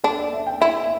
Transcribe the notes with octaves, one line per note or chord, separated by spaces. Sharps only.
D4 A4
D5
E5
G5
E4 E5
E5